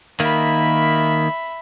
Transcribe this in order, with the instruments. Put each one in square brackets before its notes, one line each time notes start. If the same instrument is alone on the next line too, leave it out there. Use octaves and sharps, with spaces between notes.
[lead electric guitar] D#3 A#3 [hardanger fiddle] E5 B5